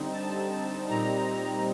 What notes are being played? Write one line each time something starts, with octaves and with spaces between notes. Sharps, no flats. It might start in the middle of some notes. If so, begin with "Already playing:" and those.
Already playing: D3 G3 C4 D#4
A5
A#2 G3 C4 D#4 A#5